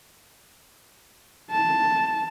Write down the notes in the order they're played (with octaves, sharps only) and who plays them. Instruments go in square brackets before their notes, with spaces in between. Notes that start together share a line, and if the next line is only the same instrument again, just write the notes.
[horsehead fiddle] A5